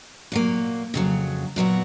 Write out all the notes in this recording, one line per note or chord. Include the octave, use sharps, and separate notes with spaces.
A#2 F#3 A#3
F2 C#3 F#3
A#2 F#3 B3 F#4